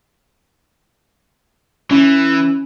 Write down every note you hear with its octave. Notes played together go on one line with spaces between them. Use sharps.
E3 C#4